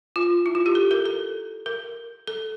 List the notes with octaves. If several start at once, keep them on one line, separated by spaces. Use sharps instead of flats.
F4
E4
F4
G4
A4
A#4
A4
A#4
A4